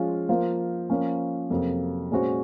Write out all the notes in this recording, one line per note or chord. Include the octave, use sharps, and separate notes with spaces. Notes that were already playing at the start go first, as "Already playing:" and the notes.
Already playing: F3 G#3 C#4 F4
F3 A#3 F4 C5
F3 A#3 C#4
F2 C3 F#3 A#3
A#2 G#3 C#4 F#4 C5